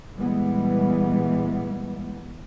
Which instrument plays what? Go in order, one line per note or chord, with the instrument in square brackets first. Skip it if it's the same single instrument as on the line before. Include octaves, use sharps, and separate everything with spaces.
[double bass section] A#2 E3 G3 G#3 B3